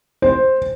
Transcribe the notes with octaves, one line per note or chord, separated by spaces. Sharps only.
C5